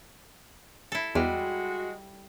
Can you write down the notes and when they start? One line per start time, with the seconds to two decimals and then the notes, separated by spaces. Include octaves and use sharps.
0.92 E4 A4
1.15 E2 G3 G#3 F#4